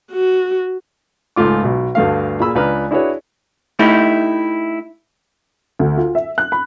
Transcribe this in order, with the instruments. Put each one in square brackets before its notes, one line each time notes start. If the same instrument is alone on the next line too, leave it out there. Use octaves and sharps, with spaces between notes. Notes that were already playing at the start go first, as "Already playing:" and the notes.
[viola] F#4
[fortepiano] C#2 G#2 A3 F4 D6
B1 B2
D2 G2 A3 F5
A#2 G#4 B5 E6
C#2 D4 B4 A#5 F6
D4 E4 F#4 G#4 B4 C#5
[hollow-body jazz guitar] A3 D#4 E4 G4
[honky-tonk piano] D2
F4
E5
F#6
B5